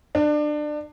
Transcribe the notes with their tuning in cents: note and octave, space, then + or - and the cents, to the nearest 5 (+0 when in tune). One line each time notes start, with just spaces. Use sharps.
D4 +25